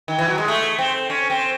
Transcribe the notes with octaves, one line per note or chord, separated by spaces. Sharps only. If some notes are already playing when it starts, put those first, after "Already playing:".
D#3
E3
F#3
G#3
A3
C4
C#4
C4